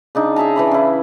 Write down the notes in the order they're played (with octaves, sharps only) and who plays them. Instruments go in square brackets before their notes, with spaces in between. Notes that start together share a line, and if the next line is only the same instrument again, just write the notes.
[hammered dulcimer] C#3 D4 D#4
G#4 E5 A5 A#5
E3 D5 B5
C#3 E4